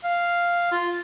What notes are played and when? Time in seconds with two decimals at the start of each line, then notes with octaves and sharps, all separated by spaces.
0.04 F5
0.71 F4